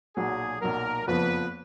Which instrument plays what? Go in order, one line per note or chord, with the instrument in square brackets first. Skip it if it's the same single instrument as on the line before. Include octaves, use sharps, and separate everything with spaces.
[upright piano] B1 A#2 F#3 [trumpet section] G#4
[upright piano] B1 A#2 F#3 [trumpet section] A#4
[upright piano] F#1 F2 F3 B3 [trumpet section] B4